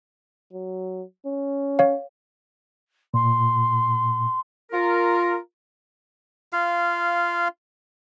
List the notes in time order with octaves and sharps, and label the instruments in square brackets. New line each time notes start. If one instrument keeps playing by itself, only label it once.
[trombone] F#3
C#4
[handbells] C#5 F5
[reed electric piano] A#2 [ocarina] C6
[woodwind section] F4 A#4
[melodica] F4 F5